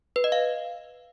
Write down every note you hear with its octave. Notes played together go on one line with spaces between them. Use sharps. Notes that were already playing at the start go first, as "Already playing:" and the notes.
B4
D#5
F5